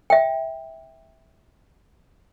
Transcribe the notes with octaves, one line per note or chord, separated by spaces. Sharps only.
E5 G5